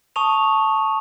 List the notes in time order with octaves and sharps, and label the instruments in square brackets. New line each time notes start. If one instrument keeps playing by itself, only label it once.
[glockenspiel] A5 C#6 D#6 F7